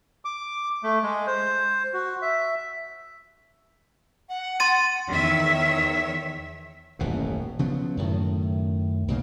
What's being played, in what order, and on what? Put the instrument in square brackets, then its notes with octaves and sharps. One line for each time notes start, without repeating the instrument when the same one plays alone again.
[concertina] D6
A3
G#3
C5
F#4
E5
[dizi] F#5
[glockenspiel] C6 A6 D#7
[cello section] E2 D#3 C#5 E5
[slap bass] D#1 A1 F#2 B2
C#3 F3 F#3 B3
F#2 A2 D#3
B1 G#2 C#3 A#3